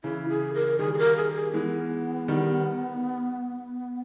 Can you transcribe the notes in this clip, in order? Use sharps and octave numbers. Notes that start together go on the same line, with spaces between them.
C#3 E3 E4
G#4
A#4
D#3 G3 G#4
G#4
A#4
G#4
G#4
E3 G#3 B3
D#3 G3